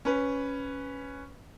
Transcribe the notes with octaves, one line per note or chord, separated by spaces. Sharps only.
C#4 B4